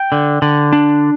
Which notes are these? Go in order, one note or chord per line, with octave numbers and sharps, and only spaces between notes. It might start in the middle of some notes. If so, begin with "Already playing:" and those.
Already playing: G5
D3
D3
D4